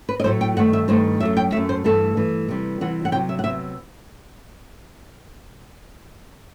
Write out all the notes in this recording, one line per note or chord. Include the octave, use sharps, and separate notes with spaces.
B4
D#5
A2 F#3 A3 C5
G5
G2 D#3 A3 F#5
E5
G2 D#3 A3 C5
F#2 F#3 A3 E5
G5
F#2 F#3 A3 E5
C5
G2 E3 A3 A4
G2 E3 A3
C3 E3 G3
C3 E3 G3 F#5
F#5
C3 F#3 B3 G5
E5
F#5
C3 F#3 B3 E5